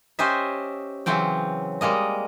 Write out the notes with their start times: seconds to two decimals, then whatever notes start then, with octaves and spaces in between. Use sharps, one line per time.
0.19 C#4 G4 C5 D#5 E5
1.06 C#3 E3 F#3 C4 G5
1.81 G3 G#3 A#3 D#5